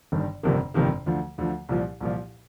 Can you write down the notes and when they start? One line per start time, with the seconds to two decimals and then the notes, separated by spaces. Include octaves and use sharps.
0.12 G1 G2 D#3
0.43 G1 F2 C3 D#3 A#3
0.74 G1 F2 C3 D#3 A#3
1.06 D2 D3 F3
1.38 D2 D3 F3
1.69 C2 A#2 F3
2.00 C2 A#2 F3